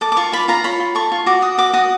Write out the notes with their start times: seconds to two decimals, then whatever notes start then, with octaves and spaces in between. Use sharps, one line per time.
0.01 A4 D6
0.12 D6
0.17 F4 C#6
0.32 F4 B5
0.48 F4 A#5
0.64 C#5 B5
0.80 F4
0.95 A4 C#6
1.12 F4
1.26 F#4 D6
1.42 F#4 D#6
1.58 F#4 D6
1.74 F#4 D#6